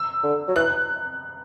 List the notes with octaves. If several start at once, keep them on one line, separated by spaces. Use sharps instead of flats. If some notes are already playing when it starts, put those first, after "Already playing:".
Already playing: E6
D3
F#3
E3 F#6